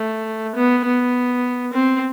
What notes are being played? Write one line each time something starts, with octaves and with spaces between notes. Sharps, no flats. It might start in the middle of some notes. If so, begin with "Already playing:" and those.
Already playing: A3
B3
B3
C4